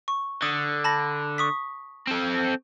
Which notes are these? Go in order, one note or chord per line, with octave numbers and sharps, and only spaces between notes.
C#6
D3 D#6
A5 B5 A#6
C#6 D#6 B6
C4 A4